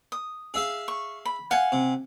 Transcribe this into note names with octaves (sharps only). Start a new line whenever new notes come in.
D#6
G#4 E5 F5
C#6
B5
F5 F#5 G#5
C3